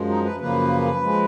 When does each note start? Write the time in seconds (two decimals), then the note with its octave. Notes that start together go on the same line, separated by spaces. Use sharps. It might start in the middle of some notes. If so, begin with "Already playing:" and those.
Already playing: F#2 F3 G#3
0.09 D#4
0.25 B4
0.40 F#2 C#3 F3 A#3 B4
1.03 F3 G#3